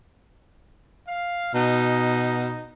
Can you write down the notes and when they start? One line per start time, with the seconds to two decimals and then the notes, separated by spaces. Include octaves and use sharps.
1.08 F5
1.54 B2 D#4